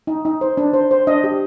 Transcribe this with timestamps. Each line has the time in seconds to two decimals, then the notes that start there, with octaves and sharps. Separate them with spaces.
0.07 D#4
0.25 D#4
0.41 C5
0.57 D4
0.74 C5
0.91 C5
1.07 D4 D#5
1.24 G4